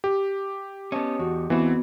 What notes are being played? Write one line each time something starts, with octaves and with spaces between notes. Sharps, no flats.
G4
B3 C#4 D#5 A5 D#6
E2 F#4
E2 E3 B3 C4 F#4